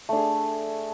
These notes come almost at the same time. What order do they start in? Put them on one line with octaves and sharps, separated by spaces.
A3 D4 G#4